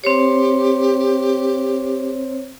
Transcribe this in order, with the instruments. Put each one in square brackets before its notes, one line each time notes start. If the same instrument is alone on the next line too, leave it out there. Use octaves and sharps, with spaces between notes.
[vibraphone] C4 C5 C#5 [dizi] G4